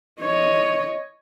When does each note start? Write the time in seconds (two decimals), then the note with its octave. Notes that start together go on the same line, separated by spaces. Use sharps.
0.20 C#5 D#5